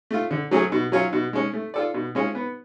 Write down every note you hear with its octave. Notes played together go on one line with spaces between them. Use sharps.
A3 F4
D3
F#3 A3 C#4 G#4
B2
F#3 C#4 F4
B2
G#3 C#4
A3
F4 A4 D5
B2
G#3 C#4 F4 G#4
B3